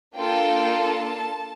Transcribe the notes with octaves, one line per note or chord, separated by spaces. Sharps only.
A#3 D4 F4 A4 G5
A5